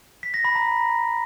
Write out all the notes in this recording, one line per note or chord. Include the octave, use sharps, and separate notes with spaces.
B6
A#6
B5
A#5